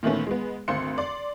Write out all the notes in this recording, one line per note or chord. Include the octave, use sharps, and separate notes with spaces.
A#2 D#3 E3 A3 B3 C#4
G#3 B3
G#1 D2 C4 F5 C6 C#7
D5 C6